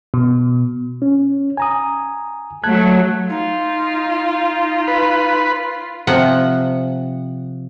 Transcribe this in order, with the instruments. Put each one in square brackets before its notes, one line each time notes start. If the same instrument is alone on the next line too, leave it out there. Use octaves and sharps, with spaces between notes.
[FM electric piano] B2
[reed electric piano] C#4
G#5 A#5 D#6
[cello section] F#3 A3 [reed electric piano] A5 F#6 G#6
[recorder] D#4 [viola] F4
[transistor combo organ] B4
[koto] C3 F3 F#5